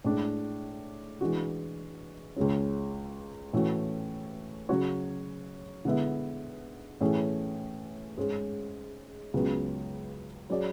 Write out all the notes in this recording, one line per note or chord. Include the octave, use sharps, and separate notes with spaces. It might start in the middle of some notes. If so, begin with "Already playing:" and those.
A2 G#3 D4
E3 G#3 D4 F#4
C#2 C#3 G#3 C#4
A2 E3 A3 C#4 F#4
C#3 F#3 C#4 F#4 C#5
D3 G#3 B3 E4
A2 E3 A3 C#4 G#4
G#2 G#3 C#4
C#2 C#3 F#3 B3
F#3 C#4 G#4 D5